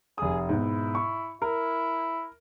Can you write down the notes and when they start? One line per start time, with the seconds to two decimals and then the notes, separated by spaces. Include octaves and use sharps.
0.18 F1 G#4 D#6
0.49 G#2 B2 E4
0.95 C#6
1.42 E4 A#4